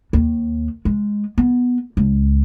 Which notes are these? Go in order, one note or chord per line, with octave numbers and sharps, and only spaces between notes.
D#2
G#3
B3
C#2